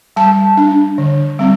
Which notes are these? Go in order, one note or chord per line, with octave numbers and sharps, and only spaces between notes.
G3 A5
D4
D3
G3 C4